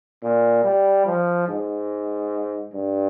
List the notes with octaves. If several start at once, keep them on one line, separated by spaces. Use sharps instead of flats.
A#2
G3
F3
G#2
G2